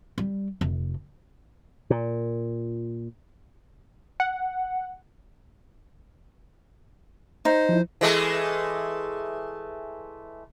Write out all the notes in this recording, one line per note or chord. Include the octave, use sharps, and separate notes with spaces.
G3
F1
A#2
F#5
D#4 C5
F3 E4
E3 G#3 A3